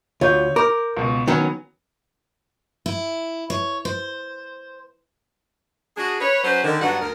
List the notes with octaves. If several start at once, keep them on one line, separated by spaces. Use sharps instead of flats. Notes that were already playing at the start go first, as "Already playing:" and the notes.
D2 F4 C#5 G6
A#4 D6
C#2 B2
D#3 F#3 B3 C#4
E4
C#5
C5
D4 F#4 G#4
B4 C#5
F#3 C#4 B4 C5
D3 D#3
G2 F#3 B3 D4 F#5
D2 A#4